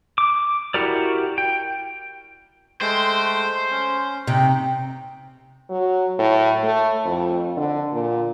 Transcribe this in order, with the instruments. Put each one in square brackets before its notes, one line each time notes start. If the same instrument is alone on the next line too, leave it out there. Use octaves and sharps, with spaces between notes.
[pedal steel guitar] D6
E4 F#4 G4 A#4 D5
G5
[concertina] G#3 A3 G5 [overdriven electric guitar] C5
[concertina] C#4
[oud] C3 [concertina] D#4 G5
[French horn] F#3
A2
A3
F2
D3
A#2